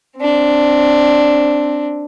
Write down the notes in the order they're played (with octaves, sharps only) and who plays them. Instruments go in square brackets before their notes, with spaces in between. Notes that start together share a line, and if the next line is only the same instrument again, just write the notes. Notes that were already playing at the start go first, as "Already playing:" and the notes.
[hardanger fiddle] C4 D4